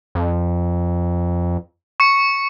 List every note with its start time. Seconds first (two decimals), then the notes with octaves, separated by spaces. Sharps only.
0.15 F2
2.00 C#6 C#7